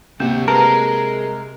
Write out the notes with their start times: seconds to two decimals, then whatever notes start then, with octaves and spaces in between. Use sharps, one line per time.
0.20 D2 C3 A#3 F#4
0.48 G#3 A#4 B4 A5